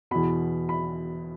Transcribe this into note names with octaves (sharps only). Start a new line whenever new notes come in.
E2 B2 B5
B5